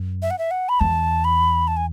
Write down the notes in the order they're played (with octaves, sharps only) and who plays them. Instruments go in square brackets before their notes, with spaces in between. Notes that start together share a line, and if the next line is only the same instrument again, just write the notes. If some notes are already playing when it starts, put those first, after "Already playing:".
Already playing: [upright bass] F#2
[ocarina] E5
F#5
E5
F#5
B5
[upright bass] E2 [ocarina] A5
[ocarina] B5
A5
G#5